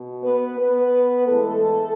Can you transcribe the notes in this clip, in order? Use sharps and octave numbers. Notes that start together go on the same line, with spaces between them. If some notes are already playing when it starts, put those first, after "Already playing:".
Already playing: B2
B3 B4
B3 B4
A2 E3 G#3 A3 A4